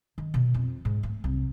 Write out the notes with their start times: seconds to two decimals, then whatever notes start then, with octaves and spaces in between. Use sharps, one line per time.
0.18 D#3
0.34 B2
0.54 F2
0.85 G#2
1.03 A3
1.24 C2